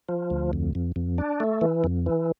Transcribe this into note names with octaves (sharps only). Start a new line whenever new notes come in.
F3
D2
F2
F2
F2
D4
A3
E3
F2
E3